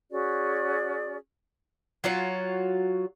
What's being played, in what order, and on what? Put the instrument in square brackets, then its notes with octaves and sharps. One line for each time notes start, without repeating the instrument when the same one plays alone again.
[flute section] C#4 F#4 G#4 D5
[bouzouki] F#3 F4 F#4 C#5